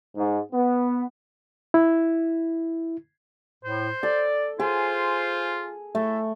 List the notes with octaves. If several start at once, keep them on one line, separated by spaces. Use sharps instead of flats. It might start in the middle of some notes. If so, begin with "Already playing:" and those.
G#2
B3
E4
A2 C5
A4 D5
F4 G#4 C5 G#5 C6
A3 E4 A4 E5